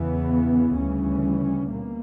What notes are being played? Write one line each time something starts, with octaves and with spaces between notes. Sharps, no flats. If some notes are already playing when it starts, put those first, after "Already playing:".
Already playing: E2 C#3 E3 B3
D2 C#3 E3 G3 C#4
B2 A#3